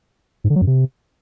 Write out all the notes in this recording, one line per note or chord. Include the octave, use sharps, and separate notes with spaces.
G#2
D3
F#3
F#2
C3